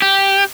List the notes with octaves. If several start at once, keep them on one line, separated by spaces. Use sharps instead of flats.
G4